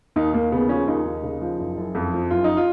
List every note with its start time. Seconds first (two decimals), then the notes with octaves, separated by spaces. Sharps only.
0.16 D#2 D#4
0.34 D#2 A#3
0.52 C#3 B3
0.69 F3 C#4
0.87 D#2 D#4
1.05 D#2
1.23 C#3
1.41 F3
1.59 F#1
1.77 F#1
1.95 F2
2.13 F3
2.31 F#1 F4
2.44 D#4
2.57 F4